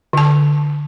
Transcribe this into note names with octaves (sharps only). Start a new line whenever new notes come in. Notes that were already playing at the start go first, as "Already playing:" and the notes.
D3 A5